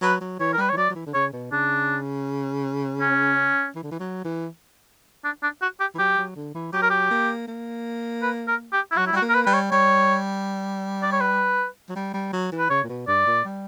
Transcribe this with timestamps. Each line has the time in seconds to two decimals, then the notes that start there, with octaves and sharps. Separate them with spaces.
0.02 F#3 B4
0.21 F#3
0.40 E3 C#5
0.53 A#4
0.58 G3 B4
0.69 C#5
0.73 E3
0.77 F#3 D5
0.90 F#3
0.95 E3
1.06 D3
1.14 C#3 C#5
1.33 B2
1.52 C#3 D4
3.00 C#4
3.76 E3
3.83 D3
3.92 E3
4.00 F#3
4.25 E3
5.24 D4
5.43 D4
5.62 F#4
5.80 G4
5.94 E3
5.99 F#3 G4
6.18 F#3
6.36 D3
6.54 E3
6.73 F#3 G4
6.82 A#4
6.90 G4
7.11 A#3
7.48 A#3
8.22 B4
8.47 A#4
8.72 G4
8.91 E4
8.97 F#3 F#4
9.07 E4
9.13 G3 F#4
9.22 A#3
9.29 A#4
9.34 B4
9.45 G3 B4
9.53 C#5
9.72 G3 C#5
11.02 D5
11.12 C#5
11.21 B4
11.90 F#3
11.96 G3
12.14 G3
12.33 F#3
12.52 E3
12.58 B4
12.70 C#3 C#5
12.84 A#2
12.89 B2
13.08 G2 D5
13.27 A#2
13.45 G3